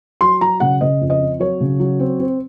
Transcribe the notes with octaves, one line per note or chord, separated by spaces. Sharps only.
F#3 C6
F#3 A#5
C#3 F#5
C#3 D#5
F2
D#5
C4
F#3 C#5
C#3
F#3
C4
C4